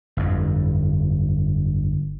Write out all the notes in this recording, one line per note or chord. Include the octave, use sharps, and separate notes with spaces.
G1 F2